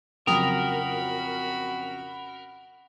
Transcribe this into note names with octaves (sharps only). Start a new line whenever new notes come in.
F2 C#3 F#3 F#4 A#4 G5 B5 D#6